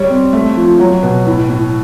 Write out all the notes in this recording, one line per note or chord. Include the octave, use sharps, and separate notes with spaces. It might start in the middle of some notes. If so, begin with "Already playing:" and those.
Already playing: G3 C#5
C4
A3
F3
F#3
B2
A2
A2